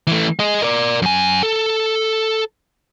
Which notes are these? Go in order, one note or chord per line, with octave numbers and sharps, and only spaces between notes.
E3 A3
G#4 D#5
A#4 D5
F#2 G#5
A4